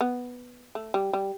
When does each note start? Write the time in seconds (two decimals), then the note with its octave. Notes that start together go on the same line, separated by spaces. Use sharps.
0.01 B3
0.75 A3
0.94 G3
1.13 G3